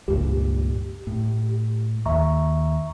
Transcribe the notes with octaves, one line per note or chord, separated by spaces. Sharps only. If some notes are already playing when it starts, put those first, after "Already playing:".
C#2 G2 A#2 G4
A2
D#2 E5 A#5 C#6